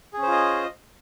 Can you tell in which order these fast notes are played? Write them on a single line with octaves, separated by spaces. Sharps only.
G#4 C#4 C5 F4 D#5